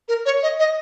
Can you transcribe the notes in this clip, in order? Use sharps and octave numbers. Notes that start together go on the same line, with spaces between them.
A#4
C#5
D#5
D#5